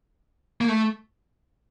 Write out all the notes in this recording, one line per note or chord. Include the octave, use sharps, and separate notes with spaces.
A#3
A3